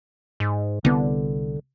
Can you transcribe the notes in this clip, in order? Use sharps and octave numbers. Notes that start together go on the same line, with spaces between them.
G#2
C2 D3 B3